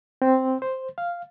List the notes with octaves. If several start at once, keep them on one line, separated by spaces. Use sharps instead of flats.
C4
C5
F5